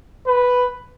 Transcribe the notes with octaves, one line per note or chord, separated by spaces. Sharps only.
B4